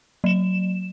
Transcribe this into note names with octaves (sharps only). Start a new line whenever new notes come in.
F#3 E7